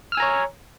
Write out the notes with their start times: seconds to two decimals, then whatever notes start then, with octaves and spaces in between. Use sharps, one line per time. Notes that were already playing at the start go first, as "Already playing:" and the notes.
0.12 F6
0.15 E6
0.17 G#5
0.20 A#5
0.22 C#5